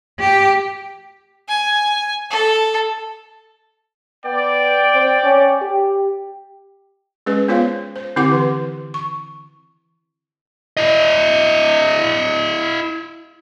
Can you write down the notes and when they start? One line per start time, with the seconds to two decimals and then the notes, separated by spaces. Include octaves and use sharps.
0.19 G4
1.49 G#5
2.31 A4
4.25 B3 D5 G5
4.94 C4
5.24 C#4
5.62 G4
7.26 G#3 C#4 G#4 B4
7.48 B3 F4 C5 C#5 F5
7.96 C5
8.16 D3 C4 E4 G4 F#5 D6
8.31 E3 B4
8.94 C#6
10.77 E4 D#5